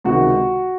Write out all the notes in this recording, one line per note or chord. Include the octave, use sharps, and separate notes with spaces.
C#2 C3 D#3 F#4